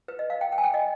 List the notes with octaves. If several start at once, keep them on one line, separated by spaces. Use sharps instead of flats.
B4
D#5
F5
G5
G5
G#5
G5
D#5